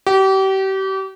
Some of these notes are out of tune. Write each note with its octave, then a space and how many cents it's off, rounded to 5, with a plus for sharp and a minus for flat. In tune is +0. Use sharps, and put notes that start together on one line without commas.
G4 -35